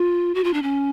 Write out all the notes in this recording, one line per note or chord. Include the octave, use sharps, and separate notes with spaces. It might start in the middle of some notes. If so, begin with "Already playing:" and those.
Already playing: F4
F#4
F4
D4
C#4